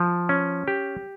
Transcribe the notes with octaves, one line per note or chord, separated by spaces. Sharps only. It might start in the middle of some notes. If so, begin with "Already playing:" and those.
Already playing: F3
C#4
G4